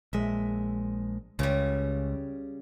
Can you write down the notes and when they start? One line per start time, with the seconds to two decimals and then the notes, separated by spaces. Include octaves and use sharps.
0.13 A#1 G#3 E5
1.39 C#2 C#3 G3